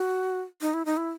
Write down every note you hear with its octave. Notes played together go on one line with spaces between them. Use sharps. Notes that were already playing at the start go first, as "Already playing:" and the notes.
Already playing: F#4
D#4
E4
D#4
E4